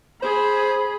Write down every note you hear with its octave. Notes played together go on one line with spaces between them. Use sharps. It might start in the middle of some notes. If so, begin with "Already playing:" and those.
G#4 C5 B5